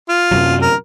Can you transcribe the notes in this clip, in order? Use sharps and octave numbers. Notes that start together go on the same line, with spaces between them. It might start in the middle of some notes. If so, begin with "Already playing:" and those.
F4
F#2 C3 F#3
A#4